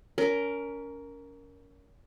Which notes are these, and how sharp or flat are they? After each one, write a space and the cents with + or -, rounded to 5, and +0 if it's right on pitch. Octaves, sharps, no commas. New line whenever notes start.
C#4 +30 A#4 +0